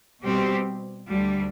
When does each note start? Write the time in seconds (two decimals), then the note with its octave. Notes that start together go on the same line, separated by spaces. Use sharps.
0.24 B2 G3 C4 G4
1.10 D2 D3 G3